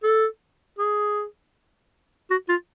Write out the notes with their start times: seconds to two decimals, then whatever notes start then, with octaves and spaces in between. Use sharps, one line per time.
0.03 A4
0.78 G#4
2.30 F#4
2.49 F4